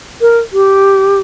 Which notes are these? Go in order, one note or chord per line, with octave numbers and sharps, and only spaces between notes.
A#4
G4